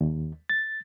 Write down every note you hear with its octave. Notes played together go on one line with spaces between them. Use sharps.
D#2
A6